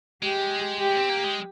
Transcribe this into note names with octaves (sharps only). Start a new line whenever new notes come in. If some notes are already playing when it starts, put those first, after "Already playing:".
G#3 G4
G4
C4
A#3
G#3